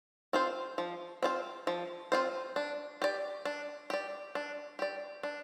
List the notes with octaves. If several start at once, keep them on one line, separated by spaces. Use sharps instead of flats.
C4 F4 C5
F3
C4 F4 C5
F3
C4 F4 C5
D4
G4 D5
D4
G4 D5
D4
G4 D5
D4